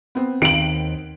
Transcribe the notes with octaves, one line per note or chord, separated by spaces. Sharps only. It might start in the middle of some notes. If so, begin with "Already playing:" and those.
B3 C4
D#2 D#3 D7 F#7